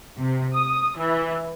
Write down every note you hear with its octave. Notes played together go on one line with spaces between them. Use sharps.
C3
D#6
E3